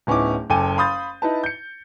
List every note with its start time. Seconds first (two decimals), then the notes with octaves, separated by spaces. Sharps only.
0.07 D1 B3 C#4 D#4 E4 D6
0.50 F#1 A4 G5 G#5 D6 D#7
0.77 F5 B5 C6 D#6 G6 A6
1.22 D#4 E4 B4 A5
1.44 G6 C#7